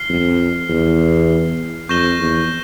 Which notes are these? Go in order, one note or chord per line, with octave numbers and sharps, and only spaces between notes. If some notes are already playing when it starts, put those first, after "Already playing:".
Already playing: F6 C7 G7
F2
E2
F2 C#6 G6 A#6 E7 G7
E2